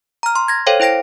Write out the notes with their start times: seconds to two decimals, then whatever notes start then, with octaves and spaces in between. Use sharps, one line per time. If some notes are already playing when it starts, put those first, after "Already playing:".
0.23 A#5 F6
0.36 C6
0.48 G#6 A#6
0.67 A4 C5 C#5 F5 G5
0.80 E4 C5 G5 A#6 D7